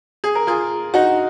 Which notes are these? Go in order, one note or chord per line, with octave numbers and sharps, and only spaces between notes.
G#4
A#4
F4 G#4
D#4 F#4